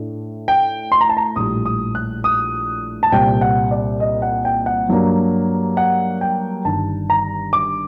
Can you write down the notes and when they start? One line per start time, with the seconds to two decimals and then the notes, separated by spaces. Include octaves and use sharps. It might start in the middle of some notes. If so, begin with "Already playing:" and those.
Already playing: A2 A3 D4
0.48 G5
0.92 C6
1.01 A#5
1.09 A5
1.17 A#5
1.36 A#1 A2 G3 D#6
1.65 D#6
1.95 F#6
2.24 D#6
3.03 A5
3.12 C2 A#2 G3 C4 G5
3.41 F#5
3.71 D5
4.00 D#5
4.22 F#5
4.45 G5
4.66 F#5
4.89 G2 F#3 A#3 D4
5.77 F#5
6.21 G5
6.65 G1 G2 D#3 A5
7.10 A#5
7.53 D6